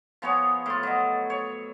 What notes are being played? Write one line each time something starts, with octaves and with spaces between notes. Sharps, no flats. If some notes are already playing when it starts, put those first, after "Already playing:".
F3 B3 G#4 C#5
A2 F4
F#3 D#5
C#5